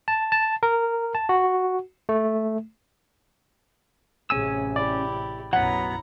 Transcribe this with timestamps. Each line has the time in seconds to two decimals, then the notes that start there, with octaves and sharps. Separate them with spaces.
0.08 A5
0.32 A5
0.63 A#4
1.15 A5
1.29 F#4
2.09 A3
4.30 A1 C3 C#4 G#4 G#5 E6
4.76 E4 G4 D5
5.53 B1 F#2 F#3 B3 E4 F#5 A#5